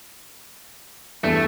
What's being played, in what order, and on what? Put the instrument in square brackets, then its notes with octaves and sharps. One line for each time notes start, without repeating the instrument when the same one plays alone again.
[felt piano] E2 G2 E3 [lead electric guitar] A3